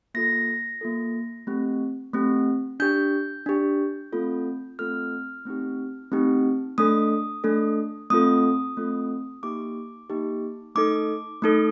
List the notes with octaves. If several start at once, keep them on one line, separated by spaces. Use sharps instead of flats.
A#3 F4 A4 A#6
A#3 F4 A4
A3 C4 G4
A3 C4 G4
D4 G4 G6
D4 G4
A3 C4 F4 A4
A3 C4 F4 A4 F6
A3 C4 D#4 G4
A3 C4 D#4 G4
A3 D4 A4 D#6
A3 D4 A4
A3 C4 F4 A4 D#6
A3 C4 F4 A4
A#3 D#4 G4 D6
A#3 D#4 G4
A3 D#4 A4 D6
A3 D#4 A4